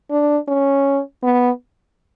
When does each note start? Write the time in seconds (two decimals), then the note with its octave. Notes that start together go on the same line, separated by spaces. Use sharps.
0.11 D4
0.48 C#4
1.23 B3